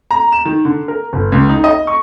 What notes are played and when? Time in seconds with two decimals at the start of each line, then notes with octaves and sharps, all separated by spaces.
0.11 A#5
0.32 E7
0.45 D#3
0.65 D3
0.88 A#4
1.13 G1
1.32 C#2
1.49 D#4
1.64 D#5
1.87 C#6